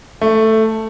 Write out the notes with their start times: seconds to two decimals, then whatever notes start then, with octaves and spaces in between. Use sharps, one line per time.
0.21 A3